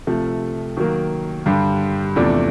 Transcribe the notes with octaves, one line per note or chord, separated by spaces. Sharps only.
C3 F3 A3
D#3 F#3 A#3
G2 D3 G3
E2 C3 F3 A3 D4